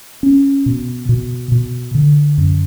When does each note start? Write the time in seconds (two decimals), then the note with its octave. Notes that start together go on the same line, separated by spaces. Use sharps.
0.23 C#4
0.66 B2
1.09 B2
1.52 B2
1.95 D3
2.38 F#2